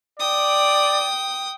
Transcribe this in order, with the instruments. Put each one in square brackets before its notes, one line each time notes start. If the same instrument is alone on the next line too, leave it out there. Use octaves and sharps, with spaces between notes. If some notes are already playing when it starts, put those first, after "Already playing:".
[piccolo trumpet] D5 [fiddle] G5 D#6